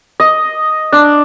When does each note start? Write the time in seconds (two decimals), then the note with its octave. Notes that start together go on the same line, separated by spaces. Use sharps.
0.20 D#5
0.92 D4